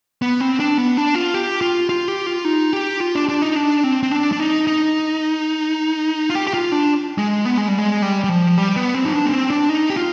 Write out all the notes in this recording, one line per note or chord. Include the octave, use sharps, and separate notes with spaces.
B3
C4
D4
B3
D4
F4
G4
F4
F4
G4
F4
D#4
G4
F4
D4
D4
D#4
D4
C4
C4
D4
D4
D#4
D#4
F4
G4
G4
F4
D4
G#3
B3
G#3
G3
G#3
G3
G3
F3
G3
B3
C4
D#4
D4
B3
C4
D4
D#4
G4
F4